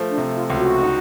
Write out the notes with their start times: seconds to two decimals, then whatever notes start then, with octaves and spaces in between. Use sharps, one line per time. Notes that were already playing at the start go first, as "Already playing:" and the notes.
Already playing: F3 A3
0.10 D4
0.18 C3
0.34 F4
0.50 C#2
0.57 F#4
0.81 D#4